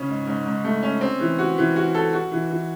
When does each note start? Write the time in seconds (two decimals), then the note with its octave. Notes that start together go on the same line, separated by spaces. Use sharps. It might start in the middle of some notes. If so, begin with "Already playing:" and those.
Already playing: C#3 C#4
0.09 G#2
0.27 G#2
0.46 G#2
0.64 A3
0.83 C#4
1.01 C4
1.20 E3
1.39 F#4
1.58 E3
1.76 F#4
1.95 A4
2.13 F#4
2.31 E3
2.50 E3